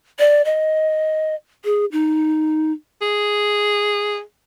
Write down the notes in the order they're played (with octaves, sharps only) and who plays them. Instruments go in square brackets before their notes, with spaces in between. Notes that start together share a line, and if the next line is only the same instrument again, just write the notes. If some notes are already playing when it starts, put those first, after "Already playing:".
[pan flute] D5
D#5
G#4
D#4
[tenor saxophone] G#4